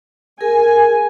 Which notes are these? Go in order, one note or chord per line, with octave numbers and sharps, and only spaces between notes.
G#4 A#4 G#5